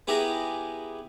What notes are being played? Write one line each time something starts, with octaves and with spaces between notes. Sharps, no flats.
B3 E4 G4 G#4 E5 A#5